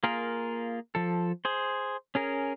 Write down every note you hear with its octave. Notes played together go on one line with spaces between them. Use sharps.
A#3 F4 G#4 A#4
F3 A4
G#4 C5
C#4 G#4 A#4